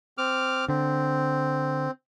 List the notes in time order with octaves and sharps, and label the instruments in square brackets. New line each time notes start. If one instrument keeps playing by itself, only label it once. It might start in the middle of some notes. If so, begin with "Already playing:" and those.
[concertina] C4 D6 F6
[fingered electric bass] D3 [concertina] C4